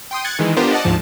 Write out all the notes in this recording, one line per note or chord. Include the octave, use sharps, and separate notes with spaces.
G5 C6 D#6
F#6 G#6 A6 C#7
D#3 E3 G#3
B3 D4 F4 G4 A#4 C5
D5 D#5 F#5 A5
D2 G#2 F3 A5